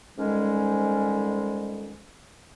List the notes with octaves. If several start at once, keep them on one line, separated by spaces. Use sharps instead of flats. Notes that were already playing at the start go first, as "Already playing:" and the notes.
F2 G#2 D#3 G3 G#3 C#4